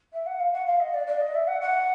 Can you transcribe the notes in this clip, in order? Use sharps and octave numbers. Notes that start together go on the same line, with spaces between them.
E5
F#5
F5
F#5
F5
D#5
D5
D5
D#5
E5
F#5
F#5